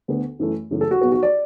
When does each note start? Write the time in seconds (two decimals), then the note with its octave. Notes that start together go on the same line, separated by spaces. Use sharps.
0.08 D2 D3 B3
0.39 F#2 E3 A3
0.70 F#1 F#2 E3 A3
0.81 A4
0.91 F#4
1.01 B1 B2 B3 F#4
1.12 F#4
1.23 D5